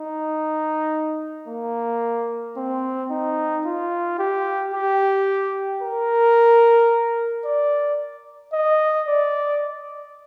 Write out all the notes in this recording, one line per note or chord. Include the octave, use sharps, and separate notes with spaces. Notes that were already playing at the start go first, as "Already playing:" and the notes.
Already playing: D#4
A#3
C4
D#4
F4
G4
G4
A#4
D5
D#5
D5